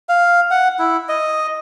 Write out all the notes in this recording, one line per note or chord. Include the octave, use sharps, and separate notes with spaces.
F5
F#5
E4
D#5